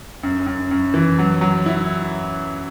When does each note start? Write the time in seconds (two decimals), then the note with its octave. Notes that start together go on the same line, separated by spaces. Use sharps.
0.23 F#2
0.46 F#2
0.71 F#2
0.94 E3
1.18 F#3
1.41 F#3
1.66 E4